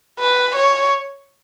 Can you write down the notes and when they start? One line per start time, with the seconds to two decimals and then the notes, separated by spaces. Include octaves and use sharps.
0.19 B4
0.55 C#5